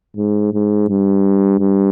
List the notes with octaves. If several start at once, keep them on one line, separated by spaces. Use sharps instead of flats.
G#2
G#2
G2
G2